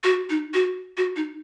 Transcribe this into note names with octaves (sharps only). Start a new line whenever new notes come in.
F#4
D#4
F#4
F#4
D#4